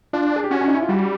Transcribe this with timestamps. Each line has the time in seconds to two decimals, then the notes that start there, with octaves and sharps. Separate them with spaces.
0.13 D4 F4
0.36 G#4
0.44 G4
0.51 C#4 F#4
0.61 D4
0.68 D#4
0.75 E4
0.83 F4
0.89 G3 F#4